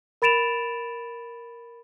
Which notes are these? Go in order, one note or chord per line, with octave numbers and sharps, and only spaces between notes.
A#4 B5 A6 D7 E7 F7